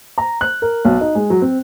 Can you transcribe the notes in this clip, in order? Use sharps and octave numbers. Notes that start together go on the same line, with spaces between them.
A#5
F#6
A#4
B1
D#4
G#3
F#3
C4